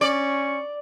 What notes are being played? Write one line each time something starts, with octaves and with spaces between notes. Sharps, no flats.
C#4 D5 C#6